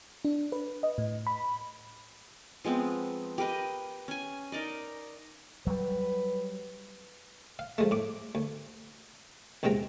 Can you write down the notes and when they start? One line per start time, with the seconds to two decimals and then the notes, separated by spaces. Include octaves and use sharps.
0.25 D4
0.52 B4
0.83 D#5
0.98 A2
1.27 B5
2.64 F3 G#3 B3 C4
3.38 G4 A#4 B4 D#5
4.08 C#4 G#5
4.52 D#4 A#4 D5 D#5
5.67 F#3 G3 B4
7.59 F5
7.78 F3 G#3 A3
7.91 A2 D6
8.35 D2
9.63 A#1 E2 C3 G#3 G5 A#5